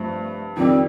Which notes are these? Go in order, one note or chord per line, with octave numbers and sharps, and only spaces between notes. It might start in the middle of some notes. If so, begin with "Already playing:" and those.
Already playing: G2 F3 A3 C4
F2 D#3 G3 C4 D4